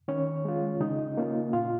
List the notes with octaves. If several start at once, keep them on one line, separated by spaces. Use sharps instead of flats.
D#3 C#4 C#5
G#3 F4
C#3 D#4 D#5
A#3 C#4 F4
A#2 F4 F5